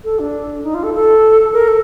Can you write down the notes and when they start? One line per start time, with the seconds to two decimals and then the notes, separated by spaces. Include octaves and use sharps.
0.04 A4
0.19 D4
0.63 D#4
0.74 F4
0.83 A4
0.94 A4
1.53 A#4
1.68 A4